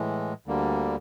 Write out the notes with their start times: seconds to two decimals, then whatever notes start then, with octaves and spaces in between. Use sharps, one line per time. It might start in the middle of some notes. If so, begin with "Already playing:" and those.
Already playing: A2 E3 G#3
0.46 D2 D3 G3 A#3